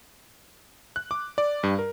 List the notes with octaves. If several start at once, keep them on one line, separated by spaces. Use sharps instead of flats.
F#6
D6
D5
G2
A#4